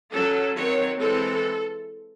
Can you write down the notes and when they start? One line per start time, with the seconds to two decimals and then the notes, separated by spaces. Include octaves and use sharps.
0.13 F#3 C#4 A4
0.56 D#3 F#3 C4 C#5
1.00 E3 G#3 C4 A4